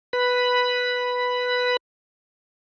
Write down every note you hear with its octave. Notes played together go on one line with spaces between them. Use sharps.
B4 B5